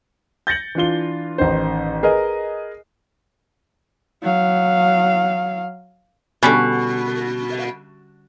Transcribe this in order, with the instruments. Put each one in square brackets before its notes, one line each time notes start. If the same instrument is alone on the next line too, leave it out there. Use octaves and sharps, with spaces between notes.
[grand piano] G6 A6 A#6 C#7 F#7
E3 D4 F4 G7
A1 D#3 D#4 C5
G#4 A#4 B4 D#5
[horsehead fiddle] F#3 F5
[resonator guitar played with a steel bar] B2 [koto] D3 G3 C#4